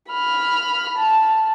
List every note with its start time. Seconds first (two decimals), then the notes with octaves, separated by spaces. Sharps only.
0.10 B5 F6
0.96 A5